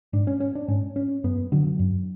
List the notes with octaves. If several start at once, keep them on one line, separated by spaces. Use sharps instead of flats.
G#2 D4
C#4
C#4
D4
G#2 C#4
C#4
F#2 B3
D3 F#3
F#2